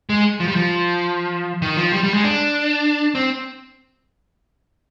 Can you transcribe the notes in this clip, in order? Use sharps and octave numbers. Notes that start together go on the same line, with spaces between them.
G#3
F3
G3
F3
D#3
F3
G3
G3
G#3
D4
C4